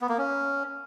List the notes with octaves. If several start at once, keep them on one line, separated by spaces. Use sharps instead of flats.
B3
A#3
C#4